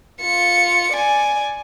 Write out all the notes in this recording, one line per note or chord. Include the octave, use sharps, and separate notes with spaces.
F4 C#7
D5 G#5